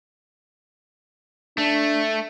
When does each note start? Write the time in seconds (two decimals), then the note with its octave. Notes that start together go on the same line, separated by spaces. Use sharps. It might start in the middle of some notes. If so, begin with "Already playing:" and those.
1.58 A3 D4